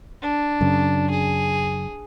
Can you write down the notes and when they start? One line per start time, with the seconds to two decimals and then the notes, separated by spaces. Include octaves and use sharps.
0.22 D4
0.61 F#2 C#3
1.10 G#4